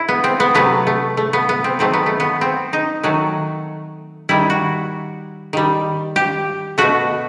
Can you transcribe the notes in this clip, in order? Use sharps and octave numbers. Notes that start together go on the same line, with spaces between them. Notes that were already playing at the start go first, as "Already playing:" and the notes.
Already playing: E4
B3
C4
B3
C3 F#3 A3 B3
A3
A3
B3
B3
C4
D#3 F#3 A3 C4
B3
A3
B3
C4
D#4
D#3 F#3 A3 F#4
D#3 G3 E4
F#4
D#3 G3
G4
B2 A3 F#4